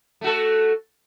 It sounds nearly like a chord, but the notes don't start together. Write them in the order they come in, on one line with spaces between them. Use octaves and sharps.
A3 F#4 A4